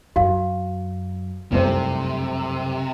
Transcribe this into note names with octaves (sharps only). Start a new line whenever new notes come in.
F#2 F#4 F5
F1 C2 F#2 C3 C5